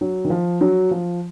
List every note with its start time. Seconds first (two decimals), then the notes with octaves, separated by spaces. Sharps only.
0.01 F#3
0.25 D#3
0.30 F3
0.61 F#3
0.91 F3